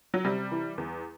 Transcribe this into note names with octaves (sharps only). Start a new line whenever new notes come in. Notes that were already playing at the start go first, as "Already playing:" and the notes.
F#3
C3 G3
E3
E2